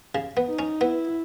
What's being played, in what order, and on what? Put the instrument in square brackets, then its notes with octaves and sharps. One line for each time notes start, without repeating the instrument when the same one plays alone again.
[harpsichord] C#3
B3
[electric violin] D#4
[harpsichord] C#4
[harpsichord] B3 [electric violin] E4